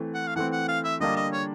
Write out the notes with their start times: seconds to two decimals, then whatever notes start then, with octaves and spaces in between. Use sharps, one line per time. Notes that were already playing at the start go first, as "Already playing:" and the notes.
Already playing: E3 A3 C4
0.14 F#5
0.27 F5
0.36 E3 A3 C4 F#5
0.52 F#5
0.68 F5
0.84 E5
1.00 D3 G3 A#3 D4 F4 D#5
1.16 D#5
1.33 C#5